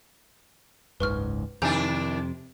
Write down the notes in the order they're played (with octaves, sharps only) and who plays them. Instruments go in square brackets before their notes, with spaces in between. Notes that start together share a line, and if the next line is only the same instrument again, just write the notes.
[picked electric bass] F#1 C#2 G#2 [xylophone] B4 C#6 F6
[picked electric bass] F2 C3 [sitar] D#3 D4 E4 [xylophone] G#5 A#5 G6